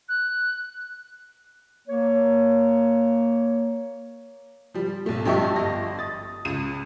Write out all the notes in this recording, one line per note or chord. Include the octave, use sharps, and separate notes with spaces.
F#6
A#3 C#5
F3 G3
B1 A3
G2 F3 G4 D#5 E5 C#6
G1 D#5 A#6
D#6 A6
C#2 D#7